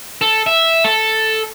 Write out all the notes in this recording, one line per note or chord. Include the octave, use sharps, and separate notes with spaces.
A4
E5
A4